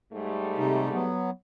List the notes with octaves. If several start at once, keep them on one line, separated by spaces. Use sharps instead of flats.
G#2 G3 A3
C3 D#4
F#3 B3